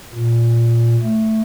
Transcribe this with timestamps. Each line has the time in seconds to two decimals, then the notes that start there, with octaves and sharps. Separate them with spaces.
0.14 A#2
1.03 A3